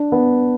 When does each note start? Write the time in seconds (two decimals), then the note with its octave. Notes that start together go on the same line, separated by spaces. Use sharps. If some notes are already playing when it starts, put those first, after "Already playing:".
Already playing: D4
0.12 B3